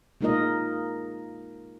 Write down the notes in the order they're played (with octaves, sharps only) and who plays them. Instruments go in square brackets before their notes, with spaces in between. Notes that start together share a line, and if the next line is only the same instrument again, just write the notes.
[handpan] G#3 A#3 D#4 F4 A#4 D#5